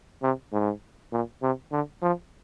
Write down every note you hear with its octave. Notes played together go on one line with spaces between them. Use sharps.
C3
G#2
A#2
C3
D3
F3